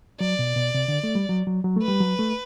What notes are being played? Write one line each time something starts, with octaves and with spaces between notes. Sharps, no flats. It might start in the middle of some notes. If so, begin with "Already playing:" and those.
F#3 D5
B2
B2
C3
D3
A3
G3
F#3
F#3
F#3
A3
B4
G3
F#3
A3